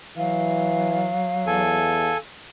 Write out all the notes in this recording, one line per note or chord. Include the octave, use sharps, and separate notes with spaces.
E3 F#3 F5
E2 A4 G#5